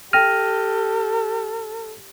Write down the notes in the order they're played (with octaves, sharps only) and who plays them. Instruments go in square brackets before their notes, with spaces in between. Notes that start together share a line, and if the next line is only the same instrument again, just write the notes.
[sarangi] G4 [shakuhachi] A4 [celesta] G5 A#6 D#7 [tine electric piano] F6